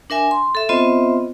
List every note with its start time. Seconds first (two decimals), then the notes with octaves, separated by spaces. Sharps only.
0.10 D4 A#4 E5 G#5
0.31 C6
0.55 A4 E5
0.69 B3 C4 F4 C5 D#5 E5